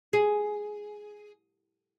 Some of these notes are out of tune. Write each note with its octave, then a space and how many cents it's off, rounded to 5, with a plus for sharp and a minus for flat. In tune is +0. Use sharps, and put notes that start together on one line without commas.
G#4 +5